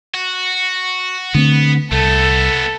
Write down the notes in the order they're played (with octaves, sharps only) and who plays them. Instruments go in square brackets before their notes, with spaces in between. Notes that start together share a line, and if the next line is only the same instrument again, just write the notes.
[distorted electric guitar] F#4
[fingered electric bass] D3 A3 C4 [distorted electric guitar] B3
[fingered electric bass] C2 [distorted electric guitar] A3 B3 [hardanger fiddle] A4